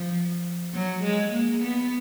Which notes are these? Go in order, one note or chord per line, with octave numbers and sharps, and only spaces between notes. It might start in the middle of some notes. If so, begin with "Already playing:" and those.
Already playing: F3
F#3
G#3
A#3
B3